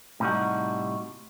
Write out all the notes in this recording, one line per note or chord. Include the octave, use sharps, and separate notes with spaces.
A2 C3 G3 D#4 F#4